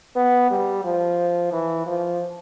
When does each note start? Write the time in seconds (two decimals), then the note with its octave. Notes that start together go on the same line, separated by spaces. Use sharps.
0.16 B3
0.51 G3
0.85 F3
1.52 E3
1.87 F3